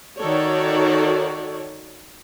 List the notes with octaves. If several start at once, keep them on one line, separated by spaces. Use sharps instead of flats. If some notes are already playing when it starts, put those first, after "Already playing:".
D#3 F#4 A4 C#5 D5